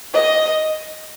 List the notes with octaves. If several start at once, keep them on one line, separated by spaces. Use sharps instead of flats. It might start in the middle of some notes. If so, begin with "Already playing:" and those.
D#5